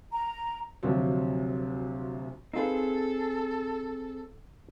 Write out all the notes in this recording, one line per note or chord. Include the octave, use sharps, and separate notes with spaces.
A#5
D2 C3 F3 F#3
C4 D#4 F4 G#4 A4 B4